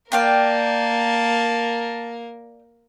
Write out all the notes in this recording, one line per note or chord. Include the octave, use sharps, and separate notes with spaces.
A#3 A#4 D5 F5 G5 A5